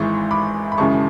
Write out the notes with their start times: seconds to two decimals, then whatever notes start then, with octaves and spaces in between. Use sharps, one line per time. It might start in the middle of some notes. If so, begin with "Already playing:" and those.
Already playing: G#1 G#2 E3 G#3 C#6
0.31 B5 D6
0.72 B5
0.78 G#1 F#2 C#3 E3 G#3 A5 C#6